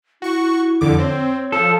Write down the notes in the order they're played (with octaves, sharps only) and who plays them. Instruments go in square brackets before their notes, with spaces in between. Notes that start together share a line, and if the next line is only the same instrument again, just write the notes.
[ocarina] E4 [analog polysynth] F#4 C#6
[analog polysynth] F2 D3 D6
[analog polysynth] C4 [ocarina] C#5
[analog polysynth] F3 [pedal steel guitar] A4